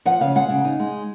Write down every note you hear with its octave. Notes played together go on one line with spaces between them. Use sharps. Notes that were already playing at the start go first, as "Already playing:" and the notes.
F3 F#5
C#3 F5
G#3 F#5
C#3
D#4
G#3